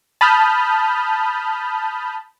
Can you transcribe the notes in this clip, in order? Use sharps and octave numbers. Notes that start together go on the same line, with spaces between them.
A5 B5 D#6 F6 G6